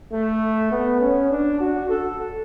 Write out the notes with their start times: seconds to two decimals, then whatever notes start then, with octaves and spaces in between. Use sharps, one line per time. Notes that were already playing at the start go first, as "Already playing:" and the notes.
0.12 A3
0.72 B3
1.00 C#4
1.31 D4
1.60 F#4
1.89 A4